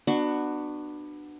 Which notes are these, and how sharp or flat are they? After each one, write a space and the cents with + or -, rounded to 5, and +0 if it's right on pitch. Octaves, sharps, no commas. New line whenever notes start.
B3 +0 D4 +25 F#4 +0